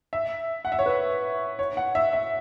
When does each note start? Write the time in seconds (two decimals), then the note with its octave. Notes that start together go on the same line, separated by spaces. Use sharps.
0.13 E5
0.65 F#5
0.72 E5
0.79 C#5
0.86 B4
1.59 C#5
1.77 F#5
1.95 E5
2.13 E5